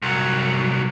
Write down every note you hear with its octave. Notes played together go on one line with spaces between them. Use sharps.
C2 F#3